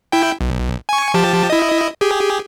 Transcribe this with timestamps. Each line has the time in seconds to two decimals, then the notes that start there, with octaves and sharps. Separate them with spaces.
0.12 E4 G5
0.41 B1
0.89 G#5 C#6
1.14 F3 G4 A5
1.50 E4 D#5
2.01 G4 G#4